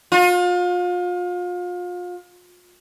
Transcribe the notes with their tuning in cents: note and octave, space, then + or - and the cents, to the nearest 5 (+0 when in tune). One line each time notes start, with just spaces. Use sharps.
F4 +35